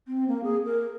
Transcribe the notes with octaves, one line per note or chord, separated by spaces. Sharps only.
C4
A#3
G#4
A#4